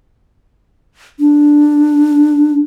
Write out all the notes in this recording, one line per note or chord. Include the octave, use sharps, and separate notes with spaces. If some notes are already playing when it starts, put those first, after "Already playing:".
D4